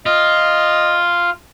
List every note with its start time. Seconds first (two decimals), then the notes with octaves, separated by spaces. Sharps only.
0.06 F4 D#5